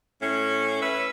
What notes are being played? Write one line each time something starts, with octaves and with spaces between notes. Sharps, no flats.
A2 C#4
B4 E5